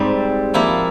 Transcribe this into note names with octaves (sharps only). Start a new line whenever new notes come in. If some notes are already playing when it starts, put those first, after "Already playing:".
Already playing: G#2 G3 C4
F3 A#3 E4